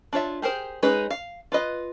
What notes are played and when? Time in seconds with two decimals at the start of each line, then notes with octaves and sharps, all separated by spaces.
0.13 D4 F4 C#5 E5
0.42 G4 G#4 A#4 C5
0.83 G#3 C#4 D#4 G#4 B4
1.11 F5
1.52 F4 B4 D#5